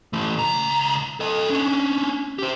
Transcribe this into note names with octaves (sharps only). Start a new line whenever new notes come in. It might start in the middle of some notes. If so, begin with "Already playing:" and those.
E3 A3
C#2 A#5
A4 D#5
C#4 D4
G4 C5